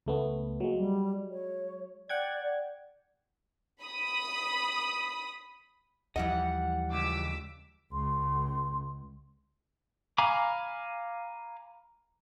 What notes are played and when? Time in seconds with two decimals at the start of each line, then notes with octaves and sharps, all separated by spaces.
0.06 C#2 A3 B3
0.60 F#3 G#3 A#3
0.77 G3
1.31 C#5
2.09 D5 F#5 G5 G#6
3.83 B5 D#6
6.16 D#2 E3 F3 G3 D#5 F#5
6.92 C#2 D6 E6 B6
7.93 C#2 C6
10.18 F5 G#5 A#5 B5 D6